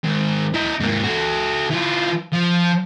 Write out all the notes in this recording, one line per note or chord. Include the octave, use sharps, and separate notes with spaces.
D#3 G#3
E4 D#5
G#2 A#3
F#4 A4
E3 F4
F3